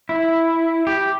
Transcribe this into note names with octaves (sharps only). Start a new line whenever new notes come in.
E4
G4